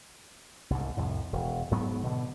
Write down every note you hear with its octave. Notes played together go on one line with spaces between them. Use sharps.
C2 G#2
C2 F2 A2
E1
G#2 F#3 B3
B2 D3